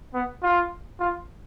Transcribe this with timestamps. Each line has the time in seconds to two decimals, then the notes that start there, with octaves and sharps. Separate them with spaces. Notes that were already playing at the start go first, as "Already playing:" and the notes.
0.14 B3
0.43 F4
1.00 F4